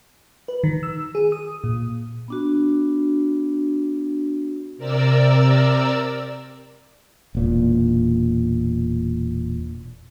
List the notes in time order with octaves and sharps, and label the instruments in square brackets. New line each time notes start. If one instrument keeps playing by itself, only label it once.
[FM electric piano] B4
D#3
E6
G#4
D#6
A#2
[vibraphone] B3 D4 F#4
[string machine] C3 A#4 D5 E6
[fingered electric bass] E1 A#2